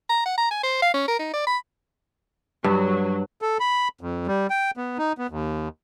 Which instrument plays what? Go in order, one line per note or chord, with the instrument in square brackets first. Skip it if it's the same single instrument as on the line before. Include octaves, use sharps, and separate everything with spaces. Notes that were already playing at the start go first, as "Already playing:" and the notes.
[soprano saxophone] A#5
F#5
A#5
G#5
C5
F5
C#4
A#4
D#4
D5
B5
[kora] G2 [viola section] F#3
[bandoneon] A4
B5
F2
G3
G5
B3
D#4
B3
D#2